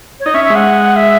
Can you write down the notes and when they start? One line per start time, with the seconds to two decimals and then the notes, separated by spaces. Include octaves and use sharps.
0.20 C#5
0.26 D#4 D#5
0.34 C#4 E5
0.44 E5
0.50 G#3
0.55 F#5
0.96 E5